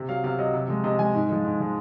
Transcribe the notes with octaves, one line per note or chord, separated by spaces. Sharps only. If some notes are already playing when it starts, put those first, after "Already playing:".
Already playing: C3
F#3 F5
C3 F5
F#3 D#5
C3
F3 G#3
C3 D#5
F3 G#3 G#5
G#2
F3 G#3
G#2
F3 G#3